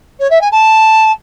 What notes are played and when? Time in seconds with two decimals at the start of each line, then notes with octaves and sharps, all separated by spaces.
0.20 C#5
0.30 E5
0.41 G#5
0.52 A5